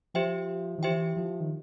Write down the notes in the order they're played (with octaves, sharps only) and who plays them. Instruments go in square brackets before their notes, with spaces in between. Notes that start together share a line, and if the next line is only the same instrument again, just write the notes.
[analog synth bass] F3 [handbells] G4 C5 E5 G5
[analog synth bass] D#3
[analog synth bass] E3 [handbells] G4 C5 E5 G5
[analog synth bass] F3
D#3